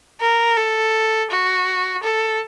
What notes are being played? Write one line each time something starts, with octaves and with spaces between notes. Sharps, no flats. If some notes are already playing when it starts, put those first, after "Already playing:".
A#4
A4
F#4
A4